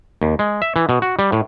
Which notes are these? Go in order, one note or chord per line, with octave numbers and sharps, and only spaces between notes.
D#2
G#3
E5
E3
B2
F#4
G3
A2